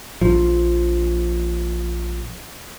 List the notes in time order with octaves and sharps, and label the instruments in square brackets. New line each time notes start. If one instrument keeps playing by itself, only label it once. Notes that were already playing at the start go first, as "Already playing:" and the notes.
[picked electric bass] A#1 F3